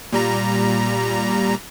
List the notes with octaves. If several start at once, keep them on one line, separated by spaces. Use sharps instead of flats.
A#2 G3 A#5